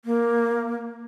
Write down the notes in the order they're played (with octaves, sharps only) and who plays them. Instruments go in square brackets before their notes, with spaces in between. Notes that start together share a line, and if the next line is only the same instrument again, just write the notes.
[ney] A#3